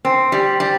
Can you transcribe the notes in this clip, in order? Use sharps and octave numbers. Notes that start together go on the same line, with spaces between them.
C4
G3
G3